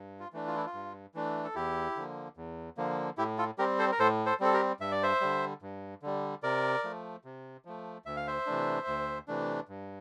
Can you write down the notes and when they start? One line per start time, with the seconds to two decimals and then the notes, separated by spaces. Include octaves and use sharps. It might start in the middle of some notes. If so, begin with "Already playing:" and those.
Already playing: G2
0.20 F4
0.33 E3 A3 D4
0.47 F4
0.56 E4
0.66 F4
0.74 G2
1.14 E3 A3 D4
1.44 A4
1.55 E2 E4 G4
1.96 D3 F3 A#3
2.37 E2
2.77 D3 F3 A#3
3.18 A2 E4 G4
3.38 F4 A4
3.58 G3 C4 G4 A#4
3.79 A4 C5
3.92 A#4
3.99 A2 A4 C5
4.26 A4 C5
4.40 G3 C4 A4
4.53 G4 A#4
4.80 G2 E5
4.92 D5
5.03 C5 E5
5.21 D3 G3
5.62 G2
6.02 D3 G3
6.43 C3 A#4 D5
6.84 F3 A3
7.24 C3
7.65 F3 A3
8.06 D2 E5
8.16 F5
8.27 C5 E5
8.46 C3 E3 A3 D4
8.87 D2
9.28 C3 E3 A3 D4
9.68 G2